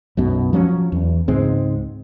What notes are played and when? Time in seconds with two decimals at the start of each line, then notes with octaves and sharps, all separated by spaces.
0.17 B1 F#2 B2
0.53 F3 F#3 B3 C#4
0.92 E2
1.28 C#2 G#2 G#3 C4